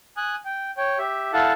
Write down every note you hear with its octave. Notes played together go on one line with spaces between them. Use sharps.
G#5 D#6 F#6
G5
C#5 G5
G4 E5
E4 A4 F5 F#5 A5